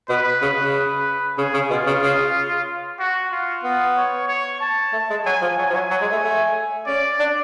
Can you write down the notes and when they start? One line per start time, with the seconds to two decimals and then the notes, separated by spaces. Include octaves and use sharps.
0.09 B2 B4
0.42 C#3
0.57 C#3
0.74 B4
1.38 C#3 G#4
1.54 C#3
1.70 B2 F4
1.86 C#3
2.02 C#3
2.99 F#4
3.32 F4
3.63 B3
3.97 C#5
4.28 C#5
4.61 A5
4.93 A3
5.10 G#3
5.26 F#3 G#5
5.42 F3
5.58 F#3 G#5
5.70 F3
5.74 F#3
5.90 F#3
6.01 G#3
6.12 A3
6.23 A3
6.87 C#4 D5
7.19 D4